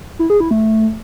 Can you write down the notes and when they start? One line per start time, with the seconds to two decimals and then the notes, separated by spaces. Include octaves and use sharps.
0.19 E4
0.30 G#4
0.40 E4
0.51 A3